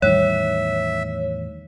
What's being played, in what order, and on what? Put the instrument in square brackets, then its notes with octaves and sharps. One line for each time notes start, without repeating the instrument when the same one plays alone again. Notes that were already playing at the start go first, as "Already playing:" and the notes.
[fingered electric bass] E2 A2 D#3 [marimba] G3 [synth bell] C#5 [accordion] E5